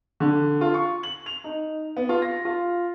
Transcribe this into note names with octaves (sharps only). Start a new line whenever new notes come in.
D3
F4
C#6
F#7
F7
D#4
B3
F4
A#6
F4